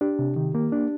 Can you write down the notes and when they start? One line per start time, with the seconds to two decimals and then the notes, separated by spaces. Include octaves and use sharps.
0.01 D4 G4
0.19 C3
0.36 D#3
0.55 A#3
0.72 D4